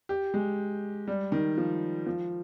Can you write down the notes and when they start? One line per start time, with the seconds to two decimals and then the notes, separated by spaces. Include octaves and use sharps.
0.09 G4
0.34 G#3
1.08 G3
1.32 D#3
1.58 F3
2.07 F3